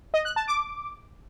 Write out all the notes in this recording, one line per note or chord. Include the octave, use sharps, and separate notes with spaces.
D#5
F#6
A5
D6